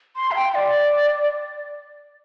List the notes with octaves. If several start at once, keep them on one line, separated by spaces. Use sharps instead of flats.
C6
E5
G5
D5